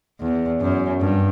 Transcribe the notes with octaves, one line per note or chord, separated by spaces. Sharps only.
E2
F#2
G2